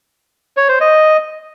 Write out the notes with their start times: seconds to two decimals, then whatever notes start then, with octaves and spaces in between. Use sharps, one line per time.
0.57 C#5
0.69 C5
0.80 D#5